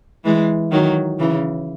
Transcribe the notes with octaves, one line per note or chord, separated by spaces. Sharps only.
E3 G#3
D#3 F#3
C#3 E3